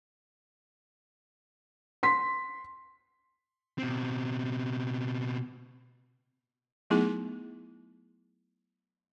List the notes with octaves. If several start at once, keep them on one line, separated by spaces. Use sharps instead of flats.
C6 B6
B2 C4
F#3 A3 B3 D#4 E4 G#4